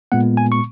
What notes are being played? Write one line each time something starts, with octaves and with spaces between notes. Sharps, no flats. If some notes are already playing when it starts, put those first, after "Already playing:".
A#2 G#3 B3 F#5
G#5
C#6